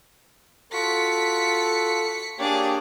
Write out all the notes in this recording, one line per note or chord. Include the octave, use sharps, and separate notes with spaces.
F4 F#4 A4 B6 C#7
A#3 D4 G4 G#4 C#5